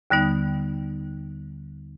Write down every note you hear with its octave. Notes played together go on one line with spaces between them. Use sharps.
D#2 D3 G3 B3 D#4